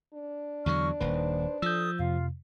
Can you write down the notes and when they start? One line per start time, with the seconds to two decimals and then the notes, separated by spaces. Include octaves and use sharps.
0.14 D4
0.66 E2 D3 F#3 C#6 F6
1.01 D#1 D#2 D#4 B4 C5
1.62 F3 A4 D#6 E6 G6
1.99 F2 C3 F4 F5